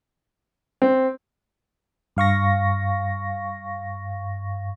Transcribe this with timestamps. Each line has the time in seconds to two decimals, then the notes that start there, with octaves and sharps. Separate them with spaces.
0.82 C4
2.16 G2 F5 C#6 A#6